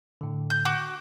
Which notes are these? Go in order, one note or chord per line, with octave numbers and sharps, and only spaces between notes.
A2 D3
G6
F#4 D6